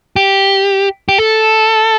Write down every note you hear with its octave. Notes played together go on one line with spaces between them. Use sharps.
G4
G4
A4